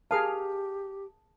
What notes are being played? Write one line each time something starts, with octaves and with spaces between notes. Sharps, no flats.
G4 G#4 A#4 F5 A5 D#6